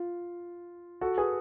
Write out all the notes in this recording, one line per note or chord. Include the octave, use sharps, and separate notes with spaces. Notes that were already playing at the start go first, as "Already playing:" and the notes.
Already playing: F4
F#4 A4
G#4 B4